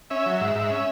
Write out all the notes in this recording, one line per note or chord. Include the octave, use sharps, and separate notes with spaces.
C#4 E5
F#3
G#2
G#2
C#4